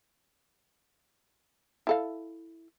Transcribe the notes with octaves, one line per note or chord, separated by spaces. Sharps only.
E4 A4 F5